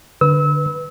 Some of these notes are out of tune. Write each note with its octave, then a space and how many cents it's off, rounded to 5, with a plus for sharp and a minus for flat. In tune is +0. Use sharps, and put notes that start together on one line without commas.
D3 +0 B4 +0 E6 -30